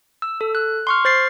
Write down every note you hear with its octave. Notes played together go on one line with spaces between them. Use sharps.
E6
A4
F#6
C6 C#6 F6
C5 A6 C7